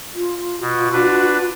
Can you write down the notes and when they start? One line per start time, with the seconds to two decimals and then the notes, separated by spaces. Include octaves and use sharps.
0.14 F4
0.61 B2
0.93 D4 F#4 B4